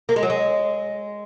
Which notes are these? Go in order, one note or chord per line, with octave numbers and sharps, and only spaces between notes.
A#3
G#3
F#3
G#3